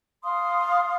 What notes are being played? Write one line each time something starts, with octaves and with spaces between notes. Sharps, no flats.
F5 C6 D#6